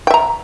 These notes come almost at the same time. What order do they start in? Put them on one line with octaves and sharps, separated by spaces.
G5 E5 A#5